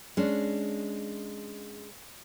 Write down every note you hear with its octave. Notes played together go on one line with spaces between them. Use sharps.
G#3 C#4 D4